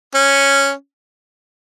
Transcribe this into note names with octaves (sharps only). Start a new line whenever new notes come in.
C#4